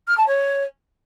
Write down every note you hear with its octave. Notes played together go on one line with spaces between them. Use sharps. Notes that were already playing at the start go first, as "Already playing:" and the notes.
F6
A5
C#5